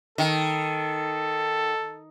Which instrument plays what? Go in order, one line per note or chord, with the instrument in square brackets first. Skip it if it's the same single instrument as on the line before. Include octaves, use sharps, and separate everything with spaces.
[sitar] D#3 [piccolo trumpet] A4